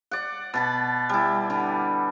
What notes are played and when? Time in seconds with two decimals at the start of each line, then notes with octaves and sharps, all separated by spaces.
0.11 D5 F#5
0.54 B2 A5 B5
1.09 G3 E4
1.50 D3